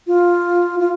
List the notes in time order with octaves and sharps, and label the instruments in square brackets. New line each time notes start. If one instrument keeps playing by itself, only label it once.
[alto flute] F4
F4